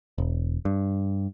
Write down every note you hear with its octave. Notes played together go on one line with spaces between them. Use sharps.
E1
G2